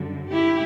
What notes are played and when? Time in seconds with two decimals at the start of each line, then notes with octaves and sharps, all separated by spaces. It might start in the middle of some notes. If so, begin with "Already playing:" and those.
Already playing: F#2 D3 G3
0.31 E4 G4